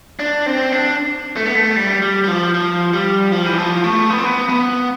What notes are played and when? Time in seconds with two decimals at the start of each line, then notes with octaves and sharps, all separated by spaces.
0.19 D4
0.46 C4
0.72 D4
1.36 A3
1.46 B3
1.55 A3
1.76 G3
2.02 G3
2.24 G3
2.28 F3
2.54 F3
2.93 G3
3.32 F3
3.46 E3
3.58 F3
3.84 A3
4.10 B3
4.19 C4
4.25 B3
4.49 B3